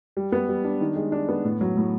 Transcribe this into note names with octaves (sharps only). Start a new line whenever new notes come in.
G3
B3
G3
D4
D#3
G#3
D4
B3
A2
F#3
A2